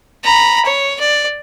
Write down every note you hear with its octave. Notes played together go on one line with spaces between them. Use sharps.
A#5 B5
C#5
D5